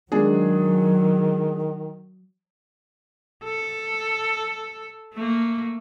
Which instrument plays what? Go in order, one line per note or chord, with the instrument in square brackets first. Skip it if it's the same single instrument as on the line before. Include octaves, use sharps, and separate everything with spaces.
[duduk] D#3 [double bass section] F#3 [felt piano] G#3 D4 G#4
[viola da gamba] A4
A3 A#3